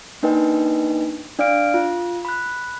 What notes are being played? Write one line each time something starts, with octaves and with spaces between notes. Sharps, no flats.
A#3 D4 D#4 B4 D#5 G5
D4 D5 F5 F6 D7
F4
B5 F#6